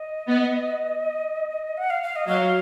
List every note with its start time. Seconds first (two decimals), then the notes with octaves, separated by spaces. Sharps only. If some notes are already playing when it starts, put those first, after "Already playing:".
Already playing: D#5
0.28 B3
1.77 F#5
1.90 F5
2.03 F5
2.16 D#5
2.27 F#3 F5